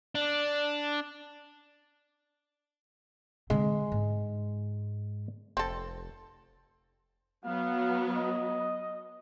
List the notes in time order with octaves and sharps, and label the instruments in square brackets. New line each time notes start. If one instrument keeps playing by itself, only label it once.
[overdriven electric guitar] D4
[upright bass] D3 C4 [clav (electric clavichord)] G#3
[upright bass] G#2
[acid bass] F1 [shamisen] C4 A4
[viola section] F#3 B3 [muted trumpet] F5
[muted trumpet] D#5